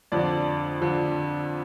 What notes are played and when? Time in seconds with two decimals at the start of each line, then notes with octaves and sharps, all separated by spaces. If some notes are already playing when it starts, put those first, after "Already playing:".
0.12 F2 D3 F3 D5
0.81 D3 F3